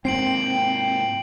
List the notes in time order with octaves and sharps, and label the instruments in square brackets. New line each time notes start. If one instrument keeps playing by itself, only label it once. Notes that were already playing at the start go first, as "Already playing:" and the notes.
[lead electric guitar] G#2 A#3 [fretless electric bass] C4 [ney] G5 [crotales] C7 D7 F#7